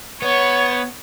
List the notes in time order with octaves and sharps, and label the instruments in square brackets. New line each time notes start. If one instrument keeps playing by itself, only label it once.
[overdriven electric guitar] B3 [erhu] C#5